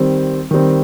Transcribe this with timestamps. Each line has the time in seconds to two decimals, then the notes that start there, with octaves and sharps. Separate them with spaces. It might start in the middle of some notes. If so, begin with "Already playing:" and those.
Already playing: D#3 G3 C4
0.51 D#3 G3 C4